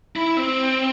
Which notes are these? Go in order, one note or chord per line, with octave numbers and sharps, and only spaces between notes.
E4
C4